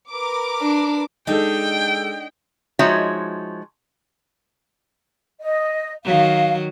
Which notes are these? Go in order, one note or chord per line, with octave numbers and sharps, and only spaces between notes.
A#4 B4 D6
D4
G#3 D4 D#4 A4 G5
F3 G#3 D#4 F#4 C#5 E5
D#5
D#3 F#3 F5